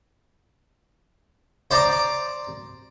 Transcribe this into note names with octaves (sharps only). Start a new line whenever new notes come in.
C5 D5 A#5 D6